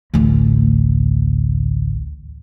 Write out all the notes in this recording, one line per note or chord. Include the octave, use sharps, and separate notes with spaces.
A1 D2